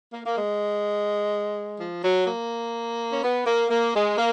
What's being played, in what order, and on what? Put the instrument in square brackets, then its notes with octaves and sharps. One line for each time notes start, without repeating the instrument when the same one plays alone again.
[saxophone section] A#3
A#3
G#3
F3
F#3
A#3
C#4
B3
A#3
A#3
G#3
A#3